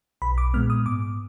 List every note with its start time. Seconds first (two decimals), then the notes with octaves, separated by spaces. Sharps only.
0.22 B1 B5
0.38 D6
0.54 A#2 G#3 B3 F6
0.70 D#6
0.86 G#2 D6